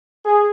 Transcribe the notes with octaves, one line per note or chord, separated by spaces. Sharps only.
G#4